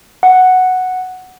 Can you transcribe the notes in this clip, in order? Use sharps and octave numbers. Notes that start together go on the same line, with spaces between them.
F#5